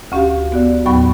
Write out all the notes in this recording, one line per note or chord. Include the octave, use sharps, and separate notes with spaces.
D2 C#4 F#4 G4 F5
B3 F#4 D5
D#2 A2 F#3 B3 B5 C#6